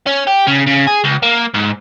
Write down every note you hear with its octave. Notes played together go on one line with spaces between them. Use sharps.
C#4
G4
C#3
C#3
G#4
C#2
A#3
G#2